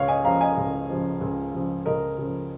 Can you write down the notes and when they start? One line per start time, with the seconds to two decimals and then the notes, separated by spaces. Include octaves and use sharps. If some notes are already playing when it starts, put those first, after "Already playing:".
Already playing: C#2 C#5 F5
0.08 D#5 G#5
0.25 C#3 F3 F5 A#5
0.41 D#5 G#5
0.57 C#2
0.89 C#3 F3
1.21 C#2
1.54 C#3 F3
1.86 C#2 A#4 D#5
2.18 C#3 F3